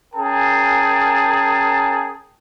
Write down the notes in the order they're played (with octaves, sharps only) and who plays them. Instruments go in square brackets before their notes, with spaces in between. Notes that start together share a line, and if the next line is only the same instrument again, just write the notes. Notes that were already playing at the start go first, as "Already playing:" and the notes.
[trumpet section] C#4 G#4 A#4 G5 A5